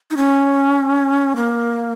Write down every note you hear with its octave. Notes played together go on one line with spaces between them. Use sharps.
D#4
C#4
A#3